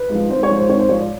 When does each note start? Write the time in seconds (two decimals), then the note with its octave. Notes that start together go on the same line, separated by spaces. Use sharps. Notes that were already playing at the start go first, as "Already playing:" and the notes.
Already playing: B4
0.10 G#2
0.15 F3
0.30 G#1 C5
0.43 C#5
0.50 G#2 F3
0.56 C5
0.69 G#1 C#5
0.79 C5
0.89 G#2 F3 C#5
0.98 D5